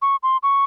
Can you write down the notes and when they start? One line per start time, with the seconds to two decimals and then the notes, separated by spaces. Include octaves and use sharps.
0.02 C#6
0.23 C6
0.43 C#6